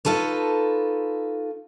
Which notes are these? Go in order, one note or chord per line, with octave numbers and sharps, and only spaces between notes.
D#4 F4 A4 B4 C#5